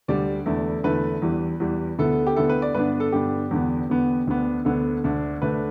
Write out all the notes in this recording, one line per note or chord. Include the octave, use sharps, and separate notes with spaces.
D2 D3 G3 D5
E2 D3 A3 E4
E2 D3 A3 E4 B4
E2 E3 G3
E2 E3 G3
D2 D3 B3 E4 A4
G4
D2 D3 B3 E4 A4
B4
D5
G2 D3 B3 D4 B4
A4
G2 D3 B3 D4 G4
E2 D3 B3
E2 D3 B3
D2 D3 B3 D4
D2 D3 B3 D4 A4
D2 D3 A3 D4
D2 D3 A3 D4 B4